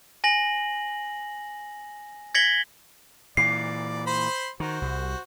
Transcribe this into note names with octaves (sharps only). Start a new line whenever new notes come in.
G#5 A#6 F#7
G#6 A#6 B6 C#7 F#7 G7
A#2 E3 D5 C7
C5 B5 C6
D#3 F#4 C5
C2